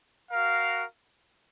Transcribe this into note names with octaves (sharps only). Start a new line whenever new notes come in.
F#4 A#4 F5